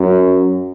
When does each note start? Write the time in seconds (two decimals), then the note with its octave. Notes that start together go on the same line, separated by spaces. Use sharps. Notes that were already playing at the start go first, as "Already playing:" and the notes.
Already playing: F#2